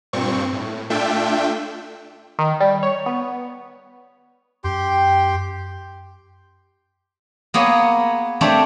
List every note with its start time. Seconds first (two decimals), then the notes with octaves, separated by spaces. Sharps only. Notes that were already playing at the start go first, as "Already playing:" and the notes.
0.13 G2 A#2 C4 C#6
0.53 A2
0.90 A3 D4 F4 E5 G5
2.39 D#3
2.60 G3
2.83 C#5
3.06 B3
4.64 F#2 G4 G5 C6
7.54 A#3 B3 G#4 C#5
8.41 A3 C4 D4 G4 C#5